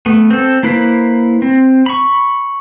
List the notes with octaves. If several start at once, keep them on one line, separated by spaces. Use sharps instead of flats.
A3 B3
C4 A4
A#3 E4 B4 C5 B5
C4
B5 C#6